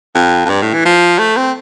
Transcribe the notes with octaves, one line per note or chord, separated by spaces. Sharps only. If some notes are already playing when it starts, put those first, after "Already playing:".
F2
F2
G2
A2
E3
F3
A3
C4